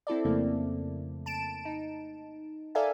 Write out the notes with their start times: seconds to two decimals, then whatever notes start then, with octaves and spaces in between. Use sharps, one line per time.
0.07 C4 E4 A4 D5
0.25 F2 C#3 A3 A#3
1.26 A5 D7 E7
1.65 D#4
2.75 A4 A#4 D5 E5 F5 G#5